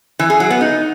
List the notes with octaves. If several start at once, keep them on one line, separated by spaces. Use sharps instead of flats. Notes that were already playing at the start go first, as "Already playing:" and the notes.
E3
G#4
F#3
B3
D#4